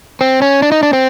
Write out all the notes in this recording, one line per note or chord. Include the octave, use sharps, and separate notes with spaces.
C4
C#4
D4
D#4
D4
C4